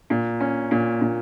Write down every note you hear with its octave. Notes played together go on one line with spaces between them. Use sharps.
A#2
C#4
A#2
A#2